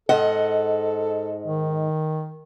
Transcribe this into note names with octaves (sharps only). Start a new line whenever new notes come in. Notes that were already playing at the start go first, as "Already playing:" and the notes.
G#2 A4 D#5 F#5
D#3